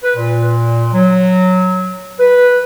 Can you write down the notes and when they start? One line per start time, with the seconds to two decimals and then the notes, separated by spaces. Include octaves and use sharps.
0.03 B4
0.16 A#2
0.93 F#3
2.20 B4